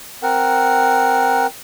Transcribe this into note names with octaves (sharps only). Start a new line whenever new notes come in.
C4 A#4 F#5